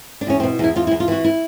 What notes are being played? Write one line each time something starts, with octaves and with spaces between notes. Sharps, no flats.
D4
E2 C#4
C4
B2
E2 E4
E2 F4
E4
E2
F4
E3 F#4
E4